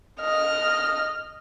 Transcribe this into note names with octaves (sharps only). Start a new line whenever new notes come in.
D#5 F6